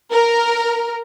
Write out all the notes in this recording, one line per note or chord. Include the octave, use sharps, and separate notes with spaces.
A#4